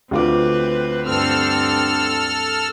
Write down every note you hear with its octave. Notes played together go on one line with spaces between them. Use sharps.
D2 C4 F4 B4 D6
G2 C4 A4 E6 F6